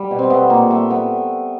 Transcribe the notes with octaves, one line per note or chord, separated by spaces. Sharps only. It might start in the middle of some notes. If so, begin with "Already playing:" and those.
Already playing: G3
B2
C4
A3 B3
A#2 A#3
A3 B3
A3 B3